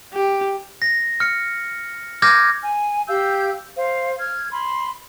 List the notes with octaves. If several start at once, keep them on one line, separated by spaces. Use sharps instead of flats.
G4
A#6
F6 C#7
D6 F6 G6 G#6 A#6
G#5
G4 F5 E6 G6
C5 F5
F6 G#6
B5 C6